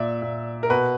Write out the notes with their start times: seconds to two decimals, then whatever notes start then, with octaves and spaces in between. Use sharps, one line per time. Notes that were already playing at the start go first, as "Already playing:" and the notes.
Already playing: A#2 D5 E5
0.22 A#2
0.63 A#4
0.70 B2 B4